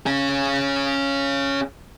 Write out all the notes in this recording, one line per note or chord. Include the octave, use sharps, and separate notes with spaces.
C#4 G#4